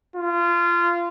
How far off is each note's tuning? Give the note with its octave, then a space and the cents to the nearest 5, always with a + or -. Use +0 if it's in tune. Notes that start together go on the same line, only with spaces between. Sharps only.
F4 -25